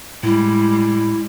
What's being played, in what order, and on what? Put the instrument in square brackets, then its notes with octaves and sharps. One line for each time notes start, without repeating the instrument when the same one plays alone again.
[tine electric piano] A2 [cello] G3 G#3 [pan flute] E4